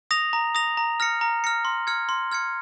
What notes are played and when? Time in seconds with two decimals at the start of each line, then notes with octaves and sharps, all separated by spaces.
0.11 D#6 A#6 F7
0.33 A#5
0.55 D#6 A#6 F7
0.77 A#5
1.00 F6 A#6 C#7
1.21 A#5
1.44 F6 A#6 C#7
1.65 C6
1.87 F6 G#6 C#7
2.09 C6
2.32 F6 G#6 C#7